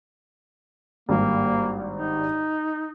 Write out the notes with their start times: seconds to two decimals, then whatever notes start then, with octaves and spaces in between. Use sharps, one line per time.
1.09 G#1 G2 G3 A#3
1.96 D#4